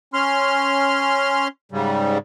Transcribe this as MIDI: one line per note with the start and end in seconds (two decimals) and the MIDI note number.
0.14 1.48 61
0.14 1.48 84
0.14 1.48 89
1.72 2.18 44
1.72 2.18 49
1.72 2.18 55